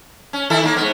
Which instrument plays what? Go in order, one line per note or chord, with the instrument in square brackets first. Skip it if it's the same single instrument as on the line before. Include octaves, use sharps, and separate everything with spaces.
[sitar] C#4
D#3 E4 A4
D#3 A#3
G#2 B2 B3